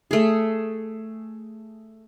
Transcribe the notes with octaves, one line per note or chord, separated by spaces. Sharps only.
A3 G#4